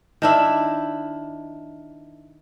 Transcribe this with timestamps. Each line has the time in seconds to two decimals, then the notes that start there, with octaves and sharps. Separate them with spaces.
0.22 D#3 D4 E4